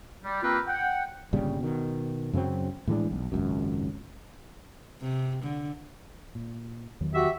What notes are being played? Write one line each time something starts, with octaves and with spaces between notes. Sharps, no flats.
G3
A#3 C4 F4 G4 A#4 B4
F#5 G5
G1 A#2 C#3 G3
B2 D#3
F#2 C#3 F#3 C4
A2 E3 G#3 D4
B1
G#1 C#2 F#2
C3
D3
A#2
E2 D#3 F#3
F#4 G4 E5